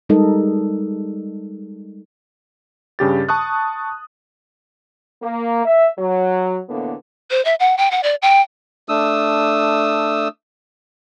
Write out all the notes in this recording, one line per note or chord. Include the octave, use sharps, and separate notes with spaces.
G3 G#3 D#4 A4 A#4 D#5
G2 C#3 G4 A6
A5 C#6 D#6 F#6
A#3
E5
F#3
E2 A2 D3 A#3 B3
C5
E5
F#5
G5
F#5
D5
G5
A3 D4 D#6 E6